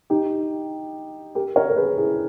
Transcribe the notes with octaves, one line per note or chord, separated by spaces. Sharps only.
D#4 G4
G4 A#4
A#4 C#5
A#4
G#4 B4
E4 G#4